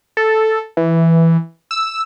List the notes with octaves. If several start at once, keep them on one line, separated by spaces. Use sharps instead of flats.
A4
E3
E6